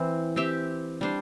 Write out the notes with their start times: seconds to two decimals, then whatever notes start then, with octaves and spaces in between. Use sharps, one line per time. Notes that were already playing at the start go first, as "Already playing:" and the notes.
Already playing: E3 C4
0.36 C4 G4 E5
1.01 G3 D4 C5